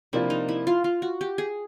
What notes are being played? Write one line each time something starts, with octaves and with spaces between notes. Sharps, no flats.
C3 F3 A#3 D4 E4 F4
D#4
E4
F4
F4
F#4
G4
G#4